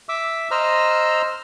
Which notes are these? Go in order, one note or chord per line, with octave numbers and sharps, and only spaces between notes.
E5 D6 E6
C5 D#5 A#5 E6 F6